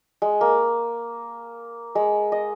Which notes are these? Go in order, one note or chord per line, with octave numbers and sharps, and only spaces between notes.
G#3
A#3
G#3
D#5